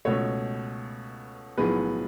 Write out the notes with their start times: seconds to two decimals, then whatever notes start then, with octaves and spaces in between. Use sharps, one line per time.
0.05 C#2 B2 A3 A4 C#5
1.57 B1 A2 F3 G#3 B3 G#4 B4